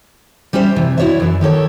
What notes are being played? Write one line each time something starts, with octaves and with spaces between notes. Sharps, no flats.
G3 C#4 G4 C5 E5
C3 E3
E4 F#4 C#5 D5 E5
F#2 E3
D#3 G4 A4 C#5